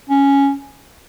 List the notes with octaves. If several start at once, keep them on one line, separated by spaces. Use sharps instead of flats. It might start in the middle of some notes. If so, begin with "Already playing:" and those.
C#4